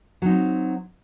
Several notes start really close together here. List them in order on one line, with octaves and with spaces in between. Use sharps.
F#3 D#4 C4